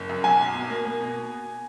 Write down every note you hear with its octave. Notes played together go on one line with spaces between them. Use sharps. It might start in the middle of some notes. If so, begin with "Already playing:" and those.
Already playing: F#1
F#2
B1 G#5
B1
B2
A#3
A#3
B2